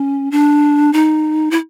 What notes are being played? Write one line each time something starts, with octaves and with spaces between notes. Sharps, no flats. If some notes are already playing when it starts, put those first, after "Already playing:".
Already playing: C#4
D4
D#4
E4